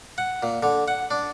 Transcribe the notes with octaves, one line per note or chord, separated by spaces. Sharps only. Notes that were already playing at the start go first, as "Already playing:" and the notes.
F#5
A#2
D3
F#5
D4